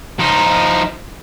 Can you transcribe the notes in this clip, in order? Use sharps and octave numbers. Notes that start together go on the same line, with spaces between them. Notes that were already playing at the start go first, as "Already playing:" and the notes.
F3 D#4